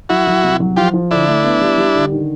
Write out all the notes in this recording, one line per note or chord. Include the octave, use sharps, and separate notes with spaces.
F#3 E4 F#4
F#3
C2
F#3
F3 F4 G4
F3
D3 D4 E4
A3
B3
G3
G3
D3
D#3